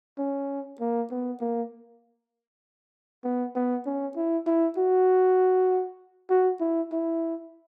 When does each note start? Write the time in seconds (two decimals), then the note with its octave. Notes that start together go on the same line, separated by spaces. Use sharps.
0.18 C#4
0.80 A#3
1.11 B3
1.41 A#3
3.24 B3
3.56 B3
3.86 C#4
4.16 E4
4.46 E4
4.78 F#4
6.30 F#4
6.60 E4
6.92 E4